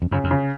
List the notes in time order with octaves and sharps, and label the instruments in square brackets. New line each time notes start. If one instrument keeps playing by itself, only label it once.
[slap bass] F2
[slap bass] F#2 [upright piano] C#3
[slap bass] F2
[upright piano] C#3